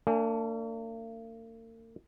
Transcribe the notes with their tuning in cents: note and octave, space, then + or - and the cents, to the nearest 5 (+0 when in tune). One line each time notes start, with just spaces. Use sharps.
A#3 -45 D4 +0 G#5 -10